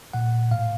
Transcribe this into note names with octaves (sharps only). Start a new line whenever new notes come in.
A#2 F#5
A2 F5